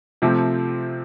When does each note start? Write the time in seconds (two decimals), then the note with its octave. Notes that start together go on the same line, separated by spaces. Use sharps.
0.22 C3 F3 A3 C4